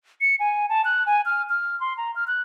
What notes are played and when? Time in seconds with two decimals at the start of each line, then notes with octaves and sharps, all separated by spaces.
0.21 C#7
0.40 G#5
0.69 A5
0.85 F#6
1.06 G#5
1.26 F6
1.49 F6
1.81 C6
1.97 A#5
2.16 F6
2.27 F#6